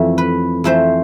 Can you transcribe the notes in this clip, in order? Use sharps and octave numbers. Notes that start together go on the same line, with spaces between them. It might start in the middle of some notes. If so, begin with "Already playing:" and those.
Already playing: F2 E3 A3
B4
F2 E3 A3 C5